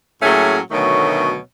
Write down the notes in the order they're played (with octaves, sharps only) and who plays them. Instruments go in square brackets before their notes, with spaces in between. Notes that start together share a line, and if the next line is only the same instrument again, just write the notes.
[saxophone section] A2 F#3 A3 A#3 C#4 G#4
D2 B2 D#3 F#3 A3 C#5